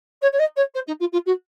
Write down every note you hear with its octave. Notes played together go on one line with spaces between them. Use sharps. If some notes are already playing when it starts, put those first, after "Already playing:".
C#5
C#5
D#5
C#5
C5
D#4
F4
F4
F#4